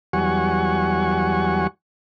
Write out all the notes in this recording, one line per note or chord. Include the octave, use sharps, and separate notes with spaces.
E2 F#3 G3 F#5 G#5 C#6